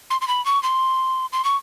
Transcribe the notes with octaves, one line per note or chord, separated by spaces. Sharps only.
C6
C6
B5
C#6
C6
C6
C#6